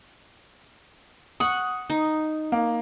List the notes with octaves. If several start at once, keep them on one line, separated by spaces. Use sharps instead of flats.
F#5 C#6 D#6
D#4
A#3